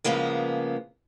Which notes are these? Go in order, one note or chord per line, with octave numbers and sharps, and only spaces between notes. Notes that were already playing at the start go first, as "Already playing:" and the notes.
C#3 F3 G#3 A#3 B3